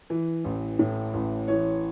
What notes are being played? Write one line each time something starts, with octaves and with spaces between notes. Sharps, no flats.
E3
A1
A2
A1
E3 C#5